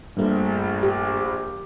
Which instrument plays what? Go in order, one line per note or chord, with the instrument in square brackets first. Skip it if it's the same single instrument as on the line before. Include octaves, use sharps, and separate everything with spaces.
[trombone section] A#1 [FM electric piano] G2 A#2 A3
[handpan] G4